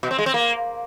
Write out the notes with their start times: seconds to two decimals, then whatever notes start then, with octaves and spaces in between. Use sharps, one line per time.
0.03 B2
0.11 C4
0.18 G#3
0.26 C4
0.34 A#3